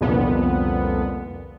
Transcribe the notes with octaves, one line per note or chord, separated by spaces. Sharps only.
C2 F2 A#2 D3 B3